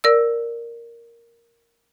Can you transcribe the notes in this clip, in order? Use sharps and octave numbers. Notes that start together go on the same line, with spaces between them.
A#4 D5 E6